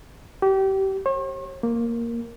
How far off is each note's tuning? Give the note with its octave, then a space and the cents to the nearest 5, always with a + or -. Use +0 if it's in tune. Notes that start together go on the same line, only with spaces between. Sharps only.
G4 -30
C#5 -45
A#3 +0